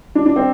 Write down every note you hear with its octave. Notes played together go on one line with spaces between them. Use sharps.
D4
D4
C4